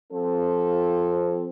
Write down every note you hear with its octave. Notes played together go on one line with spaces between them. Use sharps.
F3 C4 A4